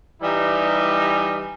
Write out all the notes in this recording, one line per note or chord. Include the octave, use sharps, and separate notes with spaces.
E3 G3 D#4